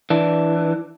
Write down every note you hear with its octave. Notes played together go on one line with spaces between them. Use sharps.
E3 D4